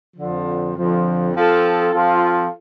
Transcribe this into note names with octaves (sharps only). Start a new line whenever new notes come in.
F2 D3 F3
F2 D3 F3
F3 C4 F4 A4
F3 C4 F4 A4